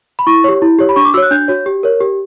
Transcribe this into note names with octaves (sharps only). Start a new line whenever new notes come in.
B5
E4 C#6
G4 C#5
E4
G4 C#5
B5
D4 C#6
D6
F#4 C#5 E6
F#6
D4 G6
F#4 C#5
G4
A#4 C#5
G4